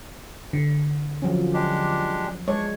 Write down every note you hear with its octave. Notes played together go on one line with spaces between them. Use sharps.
D3
F3 F#3 C#4
G#3 D4 G4
G#3 D4 C#5 C#6